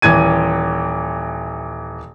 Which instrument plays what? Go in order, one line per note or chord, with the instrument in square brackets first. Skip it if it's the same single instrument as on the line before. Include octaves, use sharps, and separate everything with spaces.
[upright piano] D#1 E3 G#6 D#7